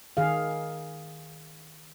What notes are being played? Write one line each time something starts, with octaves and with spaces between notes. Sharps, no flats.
D#3 G#4 F5